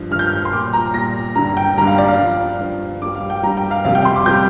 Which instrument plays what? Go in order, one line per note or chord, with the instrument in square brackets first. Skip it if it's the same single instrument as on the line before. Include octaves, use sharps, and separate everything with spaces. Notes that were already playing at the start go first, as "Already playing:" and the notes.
Already playing: [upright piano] G2 F3
G2 F6
F3 G6
F6
C6
A#2 G3 D6
A#5
A#2 G3 A#6
G2 D3 G3 A#5
G5
G2 D3 G3 A#5
F5
D5
F5
G2 F3
G2 F3
G2 G3 D6
F5
G5
G2 G3 A#5
G5
F5
F2 C3 G3 F5
G5
C6
D6
C3 G3 G6